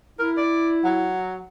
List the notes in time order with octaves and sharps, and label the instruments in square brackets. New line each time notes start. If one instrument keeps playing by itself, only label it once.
[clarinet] E4 [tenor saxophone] A#4
[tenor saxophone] D5
F#3